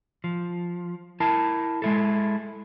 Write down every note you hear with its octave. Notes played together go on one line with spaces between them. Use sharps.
F3
E4 A#4 A5
G#3 E4 A4